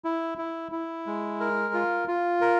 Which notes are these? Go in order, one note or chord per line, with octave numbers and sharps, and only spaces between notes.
E4
E4
E4
G#3
A#4
F4
F4
A#4